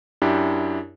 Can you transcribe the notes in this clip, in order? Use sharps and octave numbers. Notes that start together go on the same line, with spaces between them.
F#2 D4 E4 G4